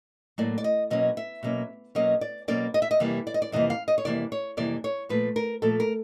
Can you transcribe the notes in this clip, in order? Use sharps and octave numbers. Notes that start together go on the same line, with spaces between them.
A2 F#3 A#3 D5
D5
D#5
B2 F#3 A#3 C#4 D#5
E5
B2 F#3 A#3 C#4
B2 F#3 A#3 C#4 D#5
D5
B2 F#3 A#3 C#4 D5
D#5
E5
D#5
F2 C3 E3 G3 A#3
D5
D#5
D5
F2 C3 E3 G3 A#3 D#5
F5
D#5
C#5
F2 C3 E3 G3 A#3 D5
C#5
F2 C3 E3 G3 A#3 D5
C#5
A#2 F3 A3 B4
A#4
A#2 F3 A3 A4
A#4